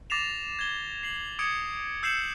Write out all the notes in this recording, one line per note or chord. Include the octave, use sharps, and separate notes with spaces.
D6 A6 A#6 C7 E7 F7
G#6 G7
C7 F#7
D6 D#6 G#6 C#7 D7
E6 G6 C7 C#7 E7 F#7